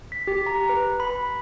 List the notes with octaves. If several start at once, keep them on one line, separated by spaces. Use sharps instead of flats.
B6
G4
A#5
B4
B5